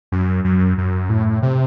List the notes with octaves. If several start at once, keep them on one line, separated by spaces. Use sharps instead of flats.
F#2
F#2
F#2
A2
C3